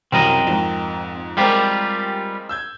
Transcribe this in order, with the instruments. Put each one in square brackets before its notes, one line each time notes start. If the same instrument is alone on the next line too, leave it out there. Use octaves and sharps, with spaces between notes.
[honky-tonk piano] C2 F#2 B5 [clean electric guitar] C4 A#4 D#5
[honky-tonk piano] F2 G#2
[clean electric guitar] G3 F4 G4 [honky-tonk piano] G#3 C4 A#4
[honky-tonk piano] E6 G6 G#6